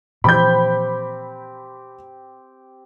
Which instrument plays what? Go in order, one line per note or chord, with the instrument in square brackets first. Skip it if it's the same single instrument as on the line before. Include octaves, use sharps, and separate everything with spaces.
[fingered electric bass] A#2 E3 F3 [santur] C4 G4 [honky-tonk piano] B5 G6